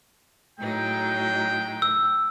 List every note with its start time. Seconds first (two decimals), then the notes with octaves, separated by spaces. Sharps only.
0.59 A2 F#3 G#3 D#4 G5
1.82 E6